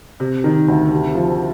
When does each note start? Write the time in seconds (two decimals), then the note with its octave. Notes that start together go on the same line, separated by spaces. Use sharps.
0.20 C3
0.44 D#3
0.68 D2
0.92 C3
1.15 F3